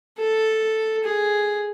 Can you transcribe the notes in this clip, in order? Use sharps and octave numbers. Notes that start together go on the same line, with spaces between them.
A4
G#4